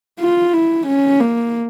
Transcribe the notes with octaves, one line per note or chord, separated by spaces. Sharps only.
F4
E4
C#4
A#3